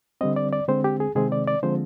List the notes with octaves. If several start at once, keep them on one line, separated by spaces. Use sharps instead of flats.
D3 G3 C4 D#5
D5
D5
D3 G#3 C4 C5
G4
G#4
C3 D#3 G#3 C4 G#4
D5
D5
D3 F3 G#3 C4 C5